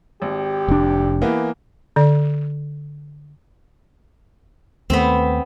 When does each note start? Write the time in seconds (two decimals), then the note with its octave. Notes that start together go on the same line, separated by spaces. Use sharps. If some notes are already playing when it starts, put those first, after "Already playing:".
0.22 G#1 G4
0.68 F1 D4
1.22 E3 A#3 B3
1.96 D3 D5
4.90 D#2 A3 B3 C4